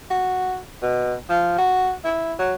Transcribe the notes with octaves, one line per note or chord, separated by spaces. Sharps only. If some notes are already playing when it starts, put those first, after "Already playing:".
F#4
B2
F3
F#4
E4
F#3